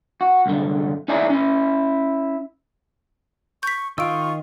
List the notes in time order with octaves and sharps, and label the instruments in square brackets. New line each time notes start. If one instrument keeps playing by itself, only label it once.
[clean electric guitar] F#4
C2 F#2 D3
D#4 E4 D5 E5 G#5 A#5
C#4 E4
[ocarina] C#6 [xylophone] G6 B6
[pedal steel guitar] D#3 D#5 G5 [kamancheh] F4 [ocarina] C#6 [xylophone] E6 D7